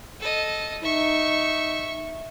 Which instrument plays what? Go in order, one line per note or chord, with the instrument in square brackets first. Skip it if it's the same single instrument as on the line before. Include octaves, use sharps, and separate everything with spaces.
[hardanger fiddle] A4 D#5
[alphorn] D#4 [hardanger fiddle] E5 C#6